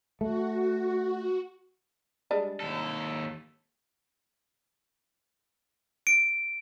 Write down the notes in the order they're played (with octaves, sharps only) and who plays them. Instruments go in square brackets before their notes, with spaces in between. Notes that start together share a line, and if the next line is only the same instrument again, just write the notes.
[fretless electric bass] A3 [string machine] F#4
[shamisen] G3 G#3 D4
[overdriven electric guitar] D#2 A4
[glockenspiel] D7